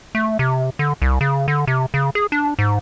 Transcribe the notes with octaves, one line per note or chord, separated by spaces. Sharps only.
A3
C3
D3
C2
C#3
D3
C3
C#3
G#4
D4
G#2